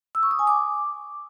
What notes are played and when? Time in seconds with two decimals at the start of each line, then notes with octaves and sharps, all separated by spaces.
0.15 E6
0.23 C#6
0.31 D#6
0.39 G#5
0.47 D6